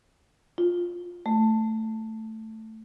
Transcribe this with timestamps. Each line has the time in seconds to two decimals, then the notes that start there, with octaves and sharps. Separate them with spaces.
0.58 F4
1.26 A3